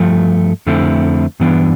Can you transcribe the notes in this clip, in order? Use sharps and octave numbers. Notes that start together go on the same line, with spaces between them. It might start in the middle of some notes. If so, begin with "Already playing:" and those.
Already playing: G2 F3 A3
F2 D3 A3 C4 E4
G2 E3 B3 D4